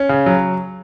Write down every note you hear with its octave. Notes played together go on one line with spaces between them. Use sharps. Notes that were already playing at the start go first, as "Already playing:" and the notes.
Already playing: C#4
C#3
F#3